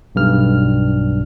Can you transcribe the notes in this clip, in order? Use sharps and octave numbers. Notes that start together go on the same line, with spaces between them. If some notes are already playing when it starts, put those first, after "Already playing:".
B1 G2 F6